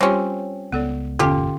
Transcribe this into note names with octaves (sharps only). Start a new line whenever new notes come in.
G3 C4 C#4 F4 G4
C#2 B3 A4 D5
G1 E2 A#2 D3 C#4 F4 G4